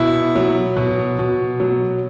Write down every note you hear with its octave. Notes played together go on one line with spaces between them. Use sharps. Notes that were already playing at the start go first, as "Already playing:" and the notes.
Already playing: B2 E4
F#3
B2
B2
F#3